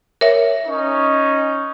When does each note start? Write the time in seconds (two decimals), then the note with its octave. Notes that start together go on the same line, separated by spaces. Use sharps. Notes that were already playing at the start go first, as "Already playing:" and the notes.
0.21 A#4 C#5 E5
0.66 C#4 D#4